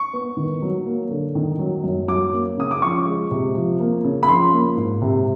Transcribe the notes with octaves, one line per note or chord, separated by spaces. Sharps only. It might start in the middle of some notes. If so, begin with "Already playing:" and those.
Already playing: C#6
B3
D#3
F#3
A#3
D3
D#3
F#3
F#2
F#3 D6
A#3
C#3 D#6
D6
F3 C#6
G#3
C3
F3
A#3
C#3
B5
F3 C6
A#3
G#2
C3